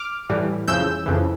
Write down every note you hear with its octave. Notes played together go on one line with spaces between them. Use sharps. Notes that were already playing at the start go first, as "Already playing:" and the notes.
Already playing: D6 F6
A2 E3 G3
F2 C#3 E3 E6 G6
F2 C#3 E3